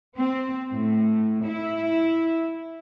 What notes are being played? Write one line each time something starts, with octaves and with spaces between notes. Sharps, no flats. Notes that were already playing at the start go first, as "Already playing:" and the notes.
C4
A2
E4